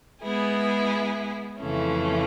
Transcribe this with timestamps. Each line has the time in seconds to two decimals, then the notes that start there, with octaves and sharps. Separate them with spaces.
0.22 G#3 B3 E4 G#4
1.60 F2 C#3 E3 A3 C#4